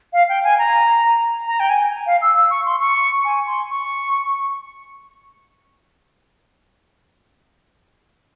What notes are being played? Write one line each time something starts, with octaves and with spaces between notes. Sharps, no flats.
F5
G5
G#5
A#5
A#5
G5
G#5
F5
E6
E6
C#6
C6
C#6
G#5
C6
C#6